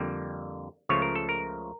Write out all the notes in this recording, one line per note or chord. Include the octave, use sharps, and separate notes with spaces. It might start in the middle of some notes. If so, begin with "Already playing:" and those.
Already playing: F2 D3 G3 A#3
C#2 C#3 F3 A3 C#5
A#4
A4
A#4